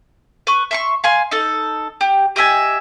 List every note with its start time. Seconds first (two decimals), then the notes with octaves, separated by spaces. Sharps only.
0.47 B4 C#6
0.71 E5 C6 C#6
1.04 F5 G#5 C6
1.31 D#4 A4
2.01 G4
2.36 G4 D#5 E5 G#5